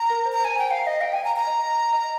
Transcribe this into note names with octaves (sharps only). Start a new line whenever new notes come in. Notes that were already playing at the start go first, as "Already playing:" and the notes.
Already playing: A#5
A#4
C5
A#5
C5
G#5
A#5
G5
F5
A#5
D#5
F5 G5
G5 G#5
F5 A#5
A#5
D#5
D#5